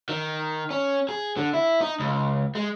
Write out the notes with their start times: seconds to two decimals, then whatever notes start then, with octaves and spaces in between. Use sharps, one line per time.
0.09 D#3
0.71 C#4
1.09 G#4
1.37 D3
1.54 E4
1.81 D#4
2.00 C#2
2.55 G#3